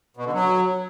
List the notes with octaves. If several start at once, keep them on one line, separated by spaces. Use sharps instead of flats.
B2
D3
F#3